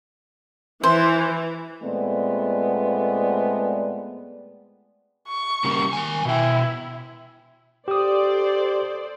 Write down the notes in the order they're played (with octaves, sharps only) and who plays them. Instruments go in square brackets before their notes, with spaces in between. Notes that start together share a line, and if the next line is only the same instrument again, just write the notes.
[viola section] E3 [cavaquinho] C5
[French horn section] A#2 G#3 A3 B3 C4 D5
[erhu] C#6
[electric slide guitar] C#3 G3 A#3
D#3 G#5
[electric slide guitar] B2 G5 [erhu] E4
[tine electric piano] G4 D#6 [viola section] A4 C5 D5